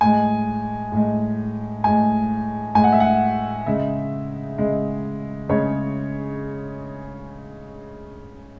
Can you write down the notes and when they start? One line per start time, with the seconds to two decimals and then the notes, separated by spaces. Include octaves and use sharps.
0.01 A2 G#3 G#5
0.92 A2 G#3
1.84 A2 G#3 G#5
2.75 A2 G#3 G#5
2.84 F#5
2.92 E5
3.00 F#5
3.66 C#3 G#3 E5
4.58 C#3 G#3
5.49 C#3 G#3 C#5